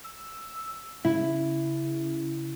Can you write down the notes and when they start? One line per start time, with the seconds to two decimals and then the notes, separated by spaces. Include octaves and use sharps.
0.04 E6
1.05 C#3 E4